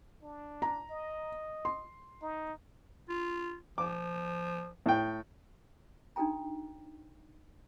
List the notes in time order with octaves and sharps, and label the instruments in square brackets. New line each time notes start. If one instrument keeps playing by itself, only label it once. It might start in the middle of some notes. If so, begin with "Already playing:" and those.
[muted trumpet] D4
[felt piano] A#5
[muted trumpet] D#5
[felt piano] C6
[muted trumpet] D#4
[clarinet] F4
[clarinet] F3 [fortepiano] D6
[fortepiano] A2 G5
[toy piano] D4 D#4 F#4 A4 G5 A#5